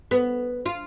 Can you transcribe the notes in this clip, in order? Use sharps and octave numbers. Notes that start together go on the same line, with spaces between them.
B3
F4